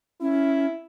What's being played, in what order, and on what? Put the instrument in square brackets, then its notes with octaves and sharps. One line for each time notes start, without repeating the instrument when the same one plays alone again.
[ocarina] C#4 [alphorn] E4